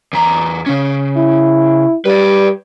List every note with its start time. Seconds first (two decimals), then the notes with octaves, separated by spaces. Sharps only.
0.13 E2 A#5
0.66 C#3 C#4
1.17 E4
2.05 G3 B4 D5